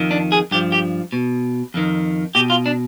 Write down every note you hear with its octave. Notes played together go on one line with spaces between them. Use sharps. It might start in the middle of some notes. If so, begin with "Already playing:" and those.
Already playing: F2 D#3
D4
G#4
G2 F3 G4
G4
B2
F2 D#3
B2 G4
F4
D4